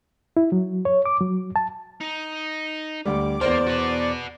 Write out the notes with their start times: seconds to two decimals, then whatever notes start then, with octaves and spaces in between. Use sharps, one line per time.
0.37 E4
0.52 F#3
0.85 C#5
1.06 D6
1.21 F#3
1.56 A5
2.01 D#4
3.05 D2 G3 D6
3.41 E2 A#3 C5 D5
3.67 F#4 B4